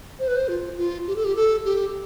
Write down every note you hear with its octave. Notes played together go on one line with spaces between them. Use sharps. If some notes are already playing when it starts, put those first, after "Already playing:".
C5
B4
C5
F4
F4
G4
A4
G4
A4
G4